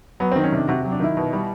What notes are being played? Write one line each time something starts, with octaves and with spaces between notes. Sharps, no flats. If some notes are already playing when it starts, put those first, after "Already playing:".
F#3 B3
D#3 C4
C#4
C3 D4
C3 F#4
G4
F#3
D4
D#3 E4
B2
G3